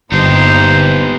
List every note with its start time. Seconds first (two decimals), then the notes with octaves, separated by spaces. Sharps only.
0.12 G1 G2 A#2 B3 D#4 G4 C5